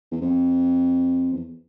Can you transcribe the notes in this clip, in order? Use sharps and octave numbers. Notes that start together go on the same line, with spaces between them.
E2
F2
E2